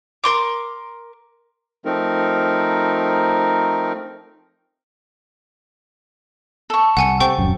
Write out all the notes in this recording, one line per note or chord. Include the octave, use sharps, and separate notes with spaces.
A#4 C6 D6
F3 A3 C4 D#4 A#4
A4 C#6
C2 F#5 G#5 C#7
C3 A4 C5 G5 C#6
D#1 F#2